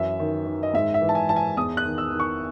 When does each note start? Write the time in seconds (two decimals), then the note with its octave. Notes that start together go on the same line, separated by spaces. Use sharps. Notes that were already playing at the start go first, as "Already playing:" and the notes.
Already playing: F#2 E3 E5
0.19 D#3
0.46 D#3
0.63 D#5
0.74 G#2 E5
0.94 E5
1.02 E3
1.09 A5
1.15 G#5
1.29 E3 A5
1.36 G#5
1.57 E2 D#6
1.77 F#6
1.85 D#3
1.98 E6
2.12 D#3
2.20 C#6